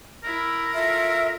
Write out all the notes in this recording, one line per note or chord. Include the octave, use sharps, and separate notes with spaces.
E4 A#4 E5
F4 A4 E5